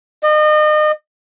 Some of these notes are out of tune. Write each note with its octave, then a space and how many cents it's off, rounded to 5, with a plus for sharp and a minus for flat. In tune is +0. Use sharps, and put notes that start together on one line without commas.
D#5 -35